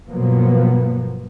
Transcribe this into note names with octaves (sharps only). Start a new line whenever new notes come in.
G2 B2 F3 F#3 A#3 B3